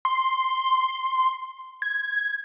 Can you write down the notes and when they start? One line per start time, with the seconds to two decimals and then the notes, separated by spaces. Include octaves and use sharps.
0.05 C6
1.82 G#6